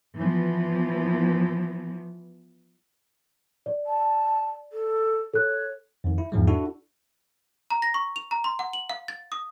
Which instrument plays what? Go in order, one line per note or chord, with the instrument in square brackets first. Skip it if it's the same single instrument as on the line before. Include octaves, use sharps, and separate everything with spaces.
[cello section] E3 F3 B3
[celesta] D5
[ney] A5
A4
[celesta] A4 F#6 [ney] C#5
[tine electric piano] F2 D#3
E4
E2 G#2 F3 G#3
D4 E4 F#4 A4
[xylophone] A#5
A#6
C#6
F7
A#5
C6
F#5
F#7
F5
A6
D#6